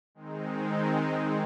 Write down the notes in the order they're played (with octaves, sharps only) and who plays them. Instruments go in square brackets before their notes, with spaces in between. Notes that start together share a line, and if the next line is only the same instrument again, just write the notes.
[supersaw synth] D#3 G#3 C4 D#4